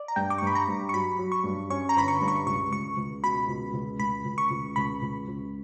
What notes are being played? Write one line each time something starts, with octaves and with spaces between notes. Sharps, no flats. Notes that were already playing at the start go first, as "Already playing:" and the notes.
Already playing: D5
A#5
G2 G5
D6
C#6
G2 B5
A#5
G2
C#6
F#3 B5
F#3
C#6
G2
C#4 C#6
A#5
G1 B5
C#6
G2
C#6
C#2 C#6
C#2 C#6
C#2
B2 B5
C#2
C#2
C#2 B5
C#2
C#6
C#2
C#2 B5
C#2
C#2